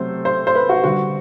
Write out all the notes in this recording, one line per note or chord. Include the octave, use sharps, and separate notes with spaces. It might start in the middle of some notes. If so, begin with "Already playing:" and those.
Already playing: C3 F#3 A3 C5
C5
C5
B4
F#4
D3 G3 F#4